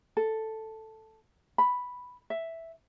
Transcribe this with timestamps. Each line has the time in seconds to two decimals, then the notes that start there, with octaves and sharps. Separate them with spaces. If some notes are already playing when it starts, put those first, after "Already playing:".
0.17 A4
1.58 B5
2.30 E5